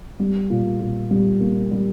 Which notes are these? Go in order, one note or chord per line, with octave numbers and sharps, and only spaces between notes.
G3
A#2
A#2
G3
A#3
G3